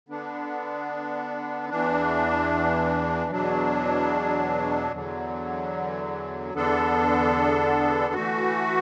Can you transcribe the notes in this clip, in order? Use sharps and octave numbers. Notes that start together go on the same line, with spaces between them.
D3 B3 D4
E2 E3 D4
E2 B2 F#3 D4
E2 D3 F#3
E2 D3 B3 D4 A4
E3 A3 F#4